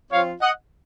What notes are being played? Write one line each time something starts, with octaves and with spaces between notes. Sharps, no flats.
F3 C4 F4 C#5 F5
D#5 F#5